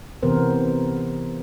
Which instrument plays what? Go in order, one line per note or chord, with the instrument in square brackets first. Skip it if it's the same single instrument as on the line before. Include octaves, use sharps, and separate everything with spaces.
[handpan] C3 E3 B3 A#4 C5